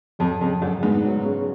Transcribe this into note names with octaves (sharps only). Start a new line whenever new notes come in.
F2 F#3
F2 C#3
F#2 D4
G#2 B3
F#3
C#3